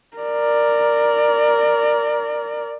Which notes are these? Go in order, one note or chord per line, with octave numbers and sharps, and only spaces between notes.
A#4 D5